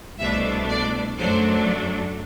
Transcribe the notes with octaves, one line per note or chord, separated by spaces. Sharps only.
C2 B2 A3 D4 E5
D5
F#2 F#3 A3 D4 C5